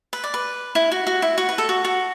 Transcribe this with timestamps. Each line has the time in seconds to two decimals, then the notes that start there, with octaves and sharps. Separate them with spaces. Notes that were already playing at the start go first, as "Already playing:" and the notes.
0.13 B4
0.24 D5
0.34 B4
0.75 E4
0.91 F#4
1.07 F#4
1.22 E4
1.38 F#4
1.49 B4
1.58 A4
1.69 F#4
1.84 F#4